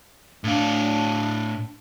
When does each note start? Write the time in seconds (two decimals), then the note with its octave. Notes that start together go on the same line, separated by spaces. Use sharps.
0.44 A2 D4 F5